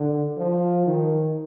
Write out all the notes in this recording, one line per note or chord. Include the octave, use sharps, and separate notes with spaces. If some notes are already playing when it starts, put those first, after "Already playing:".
Already playing: D3
F3
D#3